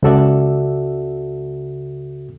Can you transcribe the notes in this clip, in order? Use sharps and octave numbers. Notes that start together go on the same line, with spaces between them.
C#2 C#3 F#4 A4 D5 E5